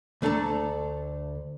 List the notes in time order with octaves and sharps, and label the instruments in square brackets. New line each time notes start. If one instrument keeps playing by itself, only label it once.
[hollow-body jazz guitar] D2 A3 D4 A4 A#5